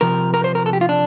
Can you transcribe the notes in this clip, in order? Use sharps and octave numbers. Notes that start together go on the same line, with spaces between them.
C3 F3 A#4
A#4
C5
A#4
A4
G4
F4
D4